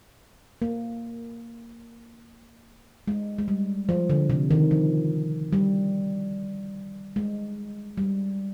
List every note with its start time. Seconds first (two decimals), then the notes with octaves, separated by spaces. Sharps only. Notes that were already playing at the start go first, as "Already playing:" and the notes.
0.62 A#3
3.08 G#3
3.38 G#3
3.48 G3
3.89 F3
4.10 D3
4.29 C3
4.51 D#3
4.71 F3
5.53 G3
7.16 G#3
7.98 G3